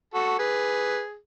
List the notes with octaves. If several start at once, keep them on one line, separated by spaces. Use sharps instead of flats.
F#4 A4
G#4 B4